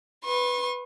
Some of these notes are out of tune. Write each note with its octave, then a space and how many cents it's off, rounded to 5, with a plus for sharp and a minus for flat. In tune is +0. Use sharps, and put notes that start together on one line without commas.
B4 +0 C#6 -45